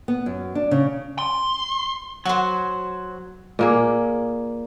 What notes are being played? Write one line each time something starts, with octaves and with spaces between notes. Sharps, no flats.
B3
F#2
D4
C#3
C6
F#3 F#4 C5
A#2 A#3 G#4